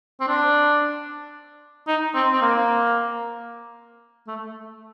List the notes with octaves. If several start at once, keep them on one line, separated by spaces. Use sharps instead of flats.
C4
D4
D#4
C4
C4
A#3
A3